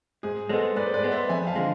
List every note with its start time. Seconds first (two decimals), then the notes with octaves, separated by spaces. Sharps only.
0.23 G#2 G#4
0.49 G#3 B3 A4 C5
0.76 G#2 B4 D5
0.87 C5
0.94 B4 D5
1.04 G#3 B3
1.11 C5 E5
1.29 F2 E5 G#5
1.47 F5 A5
1.56 D3 F3 G#3